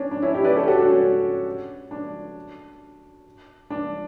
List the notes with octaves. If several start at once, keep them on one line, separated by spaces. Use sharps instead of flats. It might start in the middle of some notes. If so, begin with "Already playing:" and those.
Already playing: C#4 D4
D4
C#4 E4
E4 G4
B4 D5
A4 C#5
G4
F#4 A4
D4 F#4
C#4
C#4
D4
D4